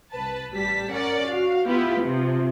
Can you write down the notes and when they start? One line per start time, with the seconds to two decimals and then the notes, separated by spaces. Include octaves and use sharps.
0.11 C2 B4 A5
0.51 A1 G3 A5 B6
0.91 C#4 A#4 D5 F#5
1.27 F#4 F5
1.65 B3 E4 F4 G4 B4
2.01 C3 F3